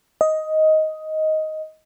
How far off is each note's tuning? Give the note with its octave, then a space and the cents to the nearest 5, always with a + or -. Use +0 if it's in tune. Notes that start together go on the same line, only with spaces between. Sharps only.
D#5 +10